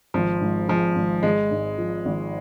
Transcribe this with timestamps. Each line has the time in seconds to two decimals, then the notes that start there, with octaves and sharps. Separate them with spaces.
0.14 G#1 F3
0.41 G#2
0.69 F3 G#3
0.96 G#1
1.23 G#1 G#3
1.51 G#2
1.78 F3
2.05 G#1